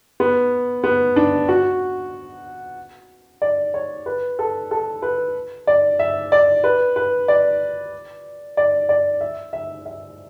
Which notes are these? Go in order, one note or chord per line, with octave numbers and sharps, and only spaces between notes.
B3
B3
D4
F#4
D5
C#5
B4
A4
A4
B4
D5
E5
D5
B4
B4
D5
D5
D5
E5
E5
E5